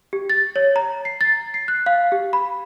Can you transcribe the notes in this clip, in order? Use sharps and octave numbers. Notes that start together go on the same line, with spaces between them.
G4
A6
C#5
A#5
C7
A6
C7
F#6
F5
G4
B5